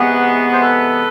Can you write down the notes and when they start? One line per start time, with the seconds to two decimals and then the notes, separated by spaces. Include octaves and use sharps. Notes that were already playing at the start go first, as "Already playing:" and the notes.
Already playing: C3 E3 G#3 B3 F#4 G#4
0.53 C5
0.61 A4 B4